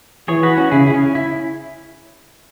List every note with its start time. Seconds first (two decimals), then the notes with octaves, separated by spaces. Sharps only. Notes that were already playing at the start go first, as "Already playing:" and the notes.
0.28 E3 G#4 C#5
0.43 F#4 B4
0.57 C#4 F#4
0.71 C#3 E4 G#4
0.87 E4
0.93 C#4
1.15 E4